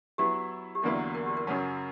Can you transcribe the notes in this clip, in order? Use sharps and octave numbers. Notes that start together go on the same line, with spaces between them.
F#3 B3 E4 G4
G4
E2 D3 F#3 A#3 E4 A#4
A#4
G4
A#4
F#2 C#3 F#3 C#4